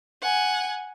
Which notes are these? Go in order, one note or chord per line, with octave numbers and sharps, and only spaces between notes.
F#5 G#5